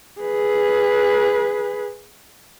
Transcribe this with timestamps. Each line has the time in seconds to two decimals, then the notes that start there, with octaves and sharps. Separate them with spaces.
0.21 G#4 B4